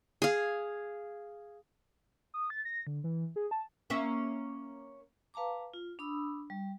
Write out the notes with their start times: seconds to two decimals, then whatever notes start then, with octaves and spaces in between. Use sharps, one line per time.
0.22 G#4 F5
2.34 D#6
2.50 A6
2.65 A#6
2.87 D3
3.04 E3
3.36 G#4
3.51 A5
3.90 A#3 C#4 E5
5.34 B4 F5 A5 A#5 D6
5.74 F4
5.99 D4 B5 D#6 E6
6.50 G3